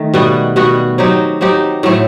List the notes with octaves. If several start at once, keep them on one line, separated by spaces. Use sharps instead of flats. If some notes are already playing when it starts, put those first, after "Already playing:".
Already playing: D#3 A3
B2 G3 B3 F#4
B2 G3 B3 F#4
F#3 C4 D#4 G4
F#3 C4 D#4 G4
A2 F#3 A3 C4